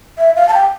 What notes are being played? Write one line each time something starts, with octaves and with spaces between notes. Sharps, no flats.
E5
F5
A5
G5